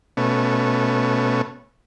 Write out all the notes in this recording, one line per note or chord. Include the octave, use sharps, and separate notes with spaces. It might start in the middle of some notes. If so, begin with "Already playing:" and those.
B2 A3 C#4